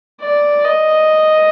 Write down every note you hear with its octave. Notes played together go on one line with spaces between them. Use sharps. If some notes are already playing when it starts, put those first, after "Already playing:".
D5
D#5